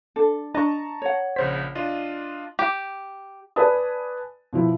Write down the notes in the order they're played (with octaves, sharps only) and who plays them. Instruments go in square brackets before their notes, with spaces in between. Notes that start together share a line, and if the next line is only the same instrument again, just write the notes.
[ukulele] D4 A4
[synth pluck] D4 [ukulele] D#5 [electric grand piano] A5 A#5 C#6
[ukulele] C#5 F#5
[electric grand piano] A#1 C#3 B6 [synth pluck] C5
[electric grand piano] D4 F4 D#5
[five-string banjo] G4
[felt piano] B4 D5 G#5 A5 D#6
B2 F3 E4